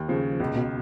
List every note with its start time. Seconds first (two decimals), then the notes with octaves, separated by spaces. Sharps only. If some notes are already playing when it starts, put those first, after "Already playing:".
Already playing: D#2
0.08 C#3 F3
0.40 C#2 B2
0.48 A#2
0.56 B2